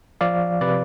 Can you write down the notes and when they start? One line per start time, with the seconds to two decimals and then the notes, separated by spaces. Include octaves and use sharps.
0.21 F3 D5 F5
0.61 C3 B4 D5